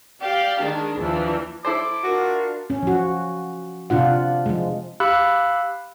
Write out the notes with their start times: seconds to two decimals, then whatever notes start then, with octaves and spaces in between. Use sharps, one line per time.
0.21 G4 D5 F5
0.61 D#3 G#3 D4
0.98 D#2 E3 F3 D4
1.65 E4 A4 C5 D6
2.03 D4 F4 F#4 A#4
2.70 C#4
2.83 F3 F#4
3.90 C3 D4 F4 F#5
4.46 F3 G#3
5.00 G4 F5 B5 E6 F#6